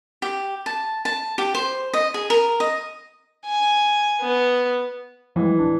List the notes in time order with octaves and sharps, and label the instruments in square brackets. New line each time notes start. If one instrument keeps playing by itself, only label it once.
[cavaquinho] G4
A5
A5
G4
C5
D#5
G#4
A#4
D#5
[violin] G#5
B3
[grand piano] E3 [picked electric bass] F3 G3 G#3
[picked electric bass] D1 D4